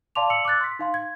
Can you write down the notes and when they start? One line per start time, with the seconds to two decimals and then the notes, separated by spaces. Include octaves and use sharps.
0.15 D5 F5 A5 C6 D6 F7
0.30 E6 C#7 F#7
0.45 D6 E6 F#6 A6
0.61 C6 B6
0.79 D#4 F5 C6
0.94 G#6